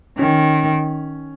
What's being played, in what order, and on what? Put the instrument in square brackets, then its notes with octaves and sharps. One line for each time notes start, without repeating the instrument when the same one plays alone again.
[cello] D#3 [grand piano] C#4